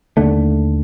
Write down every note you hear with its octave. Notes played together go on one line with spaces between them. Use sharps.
D#2 D3 A3